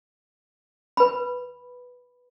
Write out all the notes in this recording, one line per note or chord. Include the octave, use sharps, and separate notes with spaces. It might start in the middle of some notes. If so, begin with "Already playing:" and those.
B4 B5